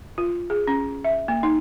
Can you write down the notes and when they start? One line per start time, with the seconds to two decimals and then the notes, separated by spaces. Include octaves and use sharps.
0.18 F4
0.50 G#4
0.67 C#4
1.04 E5
1.28 A#3
1.43 D#4